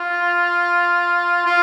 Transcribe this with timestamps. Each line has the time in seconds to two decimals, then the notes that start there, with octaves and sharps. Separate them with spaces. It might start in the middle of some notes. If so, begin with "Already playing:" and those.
Already playing: F4
1.46 F4